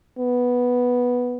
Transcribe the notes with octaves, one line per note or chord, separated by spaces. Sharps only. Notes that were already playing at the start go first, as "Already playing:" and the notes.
B3